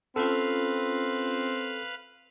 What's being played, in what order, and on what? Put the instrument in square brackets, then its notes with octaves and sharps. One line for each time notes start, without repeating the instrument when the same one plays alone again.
[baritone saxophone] C4 [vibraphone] C#4 F4 [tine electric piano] A4 [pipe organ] B4 F5